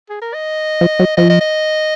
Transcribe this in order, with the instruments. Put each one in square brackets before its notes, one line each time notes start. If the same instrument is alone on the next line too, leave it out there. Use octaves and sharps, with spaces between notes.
[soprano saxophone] G#4
A#4
D#5
[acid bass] F3
F#3
[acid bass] F3 [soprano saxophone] D#5
[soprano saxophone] D#5
D#5